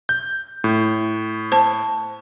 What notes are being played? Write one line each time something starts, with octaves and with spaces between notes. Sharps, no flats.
G6
A2
C5 A5